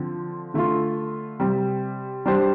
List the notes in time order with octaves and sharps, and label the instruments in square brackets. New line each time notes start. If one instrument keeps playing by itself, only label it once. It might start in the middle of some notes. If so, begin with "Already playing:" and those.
Already playing: [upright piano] D3 F3 C4
D3 A3 F4
C3 G3 C4
G3 D4 G4 C5